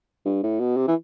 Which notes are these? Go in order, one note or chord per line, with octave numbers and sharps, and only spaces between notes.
G2
A2
B2
C3
E3